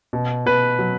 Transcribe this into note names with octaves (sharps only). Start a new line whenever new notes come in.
B2
B2 B4
F#3